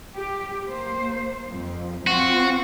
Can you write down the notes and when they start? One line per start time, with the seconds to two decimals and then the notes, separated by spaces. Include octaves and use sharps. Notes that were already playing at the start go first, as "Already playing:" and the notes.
0.15 G4
0.66 A#3 C5
1.50 F2
2.07 C4 F4 F#4